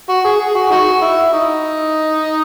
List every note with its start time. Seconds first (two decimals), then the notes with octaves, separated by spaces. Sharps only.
0.09 F#4
0.24 G#4
0.40 G#4
0.55 F#4
0.71 D#4 F#4
1.02 E4
1.33 D#4